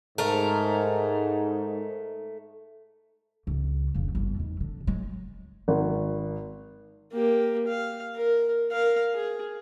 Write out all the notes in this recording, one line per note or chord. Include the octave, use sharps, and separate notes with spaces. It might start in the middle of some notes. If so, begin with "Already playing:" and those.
G#2 A3 A#4
C#2
E1 F2
G1
E2 D#3
D3
F#3 G#3
G#1
A#3 G4
F5
A#4
A#4 F5
G#4